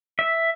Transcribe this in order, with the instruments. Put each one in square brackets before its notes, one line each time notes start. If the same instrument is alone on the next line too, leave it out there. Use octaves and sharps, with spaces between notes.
[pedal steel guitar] E5